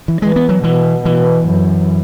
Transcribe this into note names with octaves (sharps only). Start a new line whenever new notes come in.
E3
E3 G#3
B3
F#3
B2 E3
B2 E3
F#2